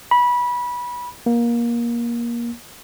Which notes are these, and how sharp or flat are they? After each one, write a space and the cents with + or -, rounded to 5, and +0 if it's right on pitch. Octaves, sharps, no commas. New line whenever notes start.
B5 -20
A#3 +20